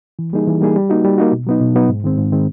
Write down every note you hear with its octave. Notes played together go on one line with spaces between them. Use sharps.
E3
G3 A#3 D#4 G#4
E3
G3 A#3 D#4 G#4
G3
A#3 D#4 F#4
G3
A#3 D#4 F#4
B2
F#3 B3 D#4
B2
F#3 B3 D#4
G#2
D#3 G#3 C4
G#2
D#3 G#3 C4